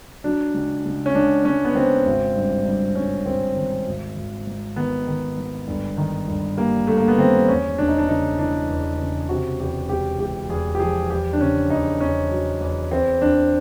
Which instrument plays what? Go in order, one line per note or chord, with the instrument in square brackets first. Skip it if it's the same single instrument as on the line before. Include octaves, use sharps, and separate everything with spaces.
[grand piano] F#3 D4
C#2
C#2
C#4
C#2 D4
C#2 C#4
B3
C#2 C4
G#1
G2
G2
G2 C#4
G#1 C4
D#3
G#1
G#1
G#2
D#3 B3
D#3
G#2
G1
D#3
G1
G3 A#3
G2 A3
A#3
B3
D#3 C4
E2 C#4
E1 D4
D#4
D4
C#3 D#4
E3 D4
E2
C#3
C3 F#4
E2 G4
E1 G4
E1 G4
E2 G#4
G4
F3 G#4
E2 G4
D4
C#3 C#4
E2 D#4
E2 C#4
F#3
E2
E2 C4
E2 D4